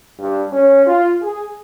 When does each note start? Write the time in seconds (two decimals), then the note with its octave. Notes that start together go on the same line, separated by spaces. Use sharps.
0.19 G2
0.51 C#4
0.86 F4
1.20 G#4